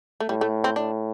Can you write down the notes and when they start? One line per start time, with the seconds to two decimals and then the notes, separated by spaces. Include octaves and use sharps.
0.20 A3
0.29 A2 G3
0.41 A3
0.64 C4
0.76 A2 D4